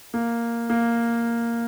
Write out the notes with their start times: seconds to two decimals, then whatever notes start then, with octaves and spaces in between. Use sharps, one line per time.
0.14 A#3
0.70 A#3